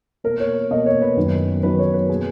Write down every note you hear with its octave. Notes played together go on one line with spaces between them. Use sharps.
B2 A#3 A#4
C#5
B2 A#3 D#5
C#5
B4
F#2 D#3 F#3 B3
F#2 D#3 F#3 B3 B4
C#5
B4
B2 A#3 G#4